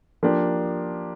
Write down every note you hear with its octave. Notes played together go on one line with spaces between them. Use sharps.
F3 A#3 D4 G4